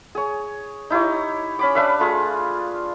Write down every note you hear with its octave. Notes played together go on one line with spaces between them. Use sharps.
G#4 C#5
D#4 E4 G4 C#5
C#4 B5 D6
D4 B4 E5 F5
A3 F4 G#4